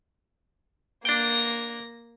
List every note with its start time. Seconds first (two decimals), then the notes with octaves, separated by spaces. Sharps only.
1.05 A#3 D4 G5 A#6